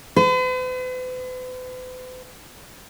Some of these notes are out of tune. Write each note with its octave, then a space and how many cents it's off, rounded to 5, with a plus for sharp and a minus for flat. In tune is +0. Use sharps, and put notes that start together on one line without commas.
B4 +45